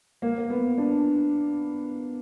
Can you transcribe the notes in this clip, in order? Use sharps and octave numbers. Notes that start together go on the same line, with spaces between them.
A#3
A#3
B3
D4